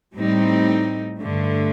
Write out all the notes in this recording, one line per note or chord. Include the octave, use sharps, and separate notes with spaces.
A2 G3 C4 D#4
G2 D3 A3